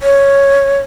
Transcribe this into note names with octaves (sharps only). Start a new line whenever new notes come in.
C#5